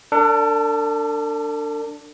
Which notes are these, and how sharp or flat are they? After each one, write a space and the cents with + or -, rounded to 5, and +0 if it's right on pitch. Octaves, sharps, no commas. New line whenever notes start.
D4 +0 A4 +45